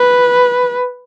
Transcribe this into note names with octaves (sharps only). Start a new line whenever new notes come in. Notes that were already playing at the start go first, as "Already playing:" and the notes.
Already playing: B4